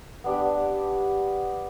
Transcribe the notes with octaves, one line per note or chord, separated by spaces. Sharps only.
B3 D4 G4 D5